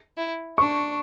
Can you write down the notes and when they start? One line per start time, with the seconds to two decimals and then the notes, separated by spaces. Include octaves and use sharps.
0.17 E4
0.58 D4 C#6